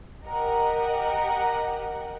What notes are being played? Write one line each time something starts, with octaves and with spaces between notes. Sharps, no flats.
G4 A#4 D#5 F#5